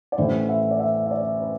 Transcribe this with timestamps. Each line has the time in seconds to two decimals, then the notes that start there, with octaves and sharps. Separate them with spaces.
0.12 D5
0.18 A1 A2 E3 C5
0.49 E5
0.71 D5
0.79 E5
1.06 E5
1.11 D5
1.41 B4